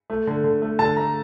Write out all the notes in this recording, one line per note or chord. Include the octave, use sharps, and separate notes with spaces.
A3
D3
D3
A3
D3 A5
A3 A#5